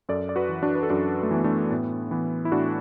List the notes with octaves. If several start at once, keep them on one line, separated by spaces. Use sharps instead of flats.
F#2 A4 D5
D5
F#4 B4
E3
D4 F#4
B4
A4
F#2 D4 F#4
A3
E3 B3
A3 D4
A2 B3
E3 B3
E4
A2 D4 F#4